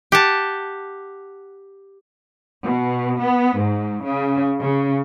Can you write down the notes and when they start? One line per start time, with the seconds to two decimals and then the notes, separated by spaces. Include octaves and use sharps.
0.12 G4 F#5 A5
2.65 B2
3.22 B3
3.60 G#2
4.06 C#3
4.61 C#3